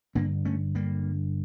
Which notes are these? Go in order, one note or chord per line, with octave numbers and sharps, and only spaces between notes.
G2 D3 A#3 D4
A3 C#4
G3 A#3